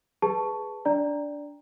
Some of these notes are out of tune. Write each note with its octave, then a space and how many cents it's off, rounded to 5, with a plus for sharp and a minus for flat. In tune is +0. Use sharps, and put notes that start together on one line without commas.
G#4 +0 B4 +0 A5 +0
D4 -15 D5 +0 A#5 +0